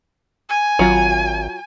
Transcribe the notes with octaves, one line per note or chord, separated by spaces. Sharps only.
G#5
G#1 F#3 F4